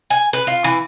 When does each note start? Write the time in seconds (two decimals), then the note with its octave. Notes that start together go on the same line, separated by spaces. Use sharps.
0.10 G#5
0.33 B4
0.47 F4
0.64 E3